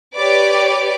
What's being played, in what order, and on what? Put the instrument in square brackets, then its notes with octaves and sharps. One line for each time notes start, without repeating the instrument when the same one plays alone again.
[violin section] G4 B4 C#5 D5 D6